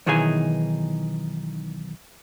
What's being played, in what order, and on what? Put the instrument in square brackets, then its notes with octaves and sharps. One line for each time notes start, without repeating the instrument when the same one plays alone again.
[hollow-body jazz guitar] B1 D#3 E3 D#4 G#4 G#5